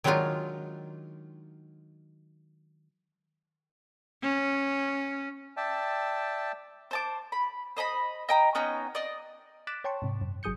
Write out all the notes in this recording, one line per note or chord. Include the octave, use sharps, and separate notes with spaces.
D#3 F#3 G#3 D4 D#4 F4
C#4
D5 E5 G5 A5
C5 A5 D6
B5
C5 D#5 A#5 B5
D#5 G5 A#5
B3 C#4 D#4 G5
D5 D#5
D6 F#6 A6 B6 D7 E7
C#5 G5 A5 C6 C#6
G#2 C3
F#2
G1 F#3 G#4 D#6 G6 C#7